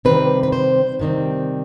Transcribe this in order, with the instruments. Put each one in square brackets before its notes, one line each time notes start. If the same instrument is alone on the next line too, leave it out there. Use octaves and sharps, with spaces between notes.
[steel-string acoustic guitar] C3 D#3 G3 C4 B4
B4
C5
C3 D#3 G3 C4